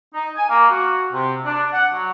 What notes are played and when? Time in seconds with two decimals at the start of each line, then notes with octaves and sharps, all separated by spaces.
0.14 D#4
0.36 G#5
0.49 A#3
0.71 F#4
1.13 C3
1.45 D4
1.73 F#5
1.94 F#3